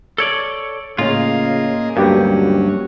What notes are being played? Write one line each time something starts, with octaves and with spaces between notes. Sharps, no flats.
A4 C#5 D5
A2 C#3 A#3 C#4 F4 G#4 D#5
D2 G2 F#3 A#3 C#4 G4 B4